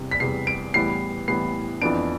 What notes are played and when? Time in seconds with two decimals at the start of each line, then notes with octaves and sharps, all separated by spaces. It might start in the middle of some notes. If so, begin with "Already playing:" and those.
Already playing: E2 C3 G3
0.11 B6
0.20 E2 C3 G3 C7
0.47 D7
0.74 A2 E3 G3 B3 C7
1.28 A2 E3 G3 B3 C7
1.82 F2 E3 B3 D4 D7